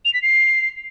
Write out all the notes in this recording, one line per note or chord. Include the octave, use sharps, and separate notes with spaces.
F7
B6
C7